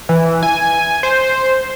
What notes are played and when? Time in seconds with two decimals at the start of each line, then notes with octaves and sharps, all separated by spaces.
0.09 E3
0.43 G#5
1.03 C5